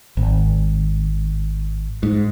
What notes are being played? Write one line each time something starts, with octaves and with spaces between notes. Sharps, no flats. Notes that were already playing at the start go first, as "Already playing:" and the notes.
G#1
G#2